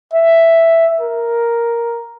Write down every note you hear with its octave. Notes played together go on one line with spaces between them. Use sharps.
E5
A#4